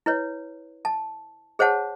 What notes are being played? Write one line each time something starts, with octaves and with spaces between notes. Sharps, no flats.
E4 B4 C#5
A5
G#4 C5 C#5 F#5 A5